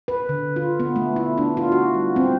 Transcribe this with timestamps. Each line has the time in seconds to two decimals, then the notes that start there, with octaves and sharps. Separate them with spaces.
0.08 B4
0.29 D3
0.56 F4
0.80 B3
0.96 A3
1.16 E4
1.38 D4
1.57 F4
1.72 F#4
1.94 G3
2.16 C4